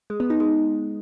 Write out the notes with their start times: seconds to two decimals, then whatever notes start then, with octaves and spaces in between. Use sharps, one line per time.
0.10 G#3
0.20 B3
0.30 D#4
0.40 G#3